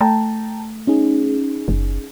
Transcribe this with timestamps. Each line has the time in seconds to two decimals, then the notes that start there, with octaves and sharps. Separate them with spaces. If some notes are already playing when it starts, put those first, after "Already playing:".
0.01 A3 G5 A5 A#5
0.87 C#4 D#4 G#4
1.68 F#1